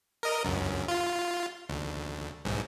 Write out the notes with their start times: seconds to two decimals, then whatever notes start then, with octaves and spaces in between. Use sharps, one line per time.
0.23 A#4 D#5
0.45 C#2 F#2
0.88 F4
1.69 D2
2.45 B1 G#2